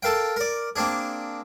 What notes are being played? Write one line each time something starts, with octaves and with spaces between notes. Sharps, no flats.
A4 A#4 F5 G5
A#4 D5
A#3 C4 D4 G#4